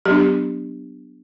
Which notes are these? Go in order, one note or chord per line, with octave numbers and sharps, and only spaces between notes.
F#3 B3 D4 G4